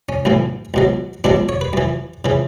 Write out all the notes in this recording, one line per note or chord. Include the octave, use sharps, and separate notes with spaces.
C#4
B1 A2 E3
C#2 B2 F#3
C#2 B2 F#3 D4
C#5
B4
F#2 E3
C#3 E3